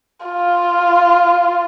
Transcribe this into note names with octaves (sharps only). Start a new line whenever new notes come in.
F4